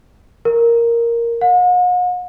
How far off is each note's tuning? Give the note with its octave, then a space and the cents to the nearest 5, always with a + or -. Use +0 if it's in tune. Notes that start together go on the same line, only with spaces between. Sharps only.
A#4 +0
F#5 -45